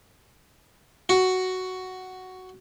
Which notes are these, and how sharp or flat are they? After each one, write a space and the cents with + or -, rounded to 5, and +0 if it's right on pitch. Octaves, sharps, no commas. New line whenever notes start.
F#4 +5